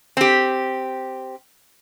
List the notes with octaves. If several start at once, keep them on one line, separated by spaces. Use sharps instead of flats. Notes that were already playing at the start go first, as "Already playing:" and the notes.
C4 G4